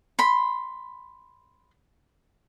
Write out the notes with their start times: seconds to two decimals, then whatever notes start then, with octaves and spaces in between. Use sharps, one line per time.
0.19 B5 C6